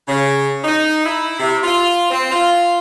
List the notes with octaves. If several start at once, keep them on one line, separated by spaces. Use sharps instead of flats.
C#3
D#4
E4
C3
F4
C4
F4